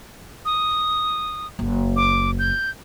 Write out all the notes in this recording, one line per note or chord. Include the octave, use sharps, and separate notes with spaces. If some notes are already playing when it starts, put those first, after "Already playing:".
D#6
F#1
D6
G6